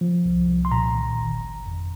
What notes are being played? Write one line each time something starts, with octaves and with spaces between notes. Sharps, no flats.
F3
C2
C2
C6
A#2 A#5
D#3
G1
G1
F2